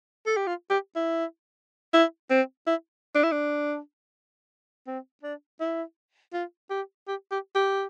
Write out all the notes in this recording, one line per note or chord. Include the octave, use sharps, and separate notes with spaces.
A4
G4
F4
G4
E4
E4
C4
E4
D4
E4
D4
C4
D4
E4
F4
G4
G4
G4
G4